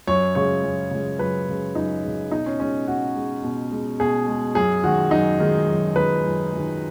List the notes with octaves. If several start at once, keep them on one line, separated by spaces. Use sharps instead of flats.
F#2 C#5
C#3 G#3 C#5
F#2
C#3 G#3
F#2 B4
C#3 G#3
F#2 D#4
C#3 G#3
B2 D#4
C#4
G#3 C#4
B2 F#4
G#3
B2
G#3
B2 G#4
G#3
F#2 G#4
D#3 G#3 F#4
F#2 D#4
D#3 G#3
F#2
D#3 G#3 B4
F#2
D#3 G#3